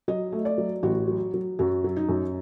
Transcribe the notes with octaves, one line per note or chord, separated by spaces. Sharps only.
F#3 D#5
A3
D5
F#3
A1 F#4
F#3
F#3
F#2 F#4
F#3
D#4
F#2